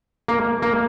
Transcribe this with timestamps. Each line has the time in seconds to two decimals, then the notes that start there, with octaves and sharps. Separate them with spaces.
0.28 A#3
0.62 A#3